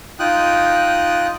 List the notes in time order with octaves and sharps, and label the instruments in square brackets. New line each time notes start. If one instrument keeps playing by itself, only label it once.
[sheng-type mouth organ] D#4 F4 G5 D#6 F#6